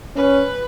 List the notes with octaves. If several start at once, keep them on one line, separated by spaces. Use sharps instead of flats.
C#4 B4